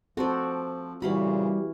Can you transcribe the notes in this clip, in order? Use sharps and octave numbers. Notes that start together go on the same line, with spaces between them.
F3 C4 F#4 A4 C5 D5
A#2 C#3 E3 G3 F#4 F5 B5